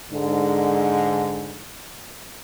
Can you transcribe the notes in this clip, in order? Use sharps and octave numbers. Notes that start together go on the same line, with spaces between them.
G#2 D3